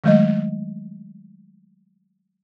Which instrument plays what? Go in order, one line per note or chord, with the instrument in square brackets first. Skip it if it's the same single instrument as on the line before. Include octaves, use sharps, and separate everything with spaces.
[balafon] D#3 F#3 G#3 A3 D#5